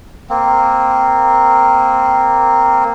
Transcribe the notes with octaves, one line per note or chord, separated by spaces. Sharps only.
A#3 C4